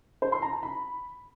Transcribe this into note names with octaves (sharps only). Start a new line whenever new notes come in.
C5
C6
A#5
A5
B5